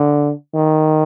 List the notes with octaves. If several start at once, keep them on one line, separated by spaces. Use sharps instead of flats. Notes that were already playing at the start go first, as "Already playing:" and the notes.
Already playing: D3
D#3